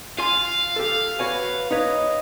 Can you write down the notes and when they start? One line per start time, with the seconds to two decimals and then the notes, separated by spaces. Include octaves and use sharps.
0.19 F4 F5 G#5 C6
0.76 G4 A4
1.19 F#4 B4 C#5 G#5
1.71 D#4 B4 C#5 D#5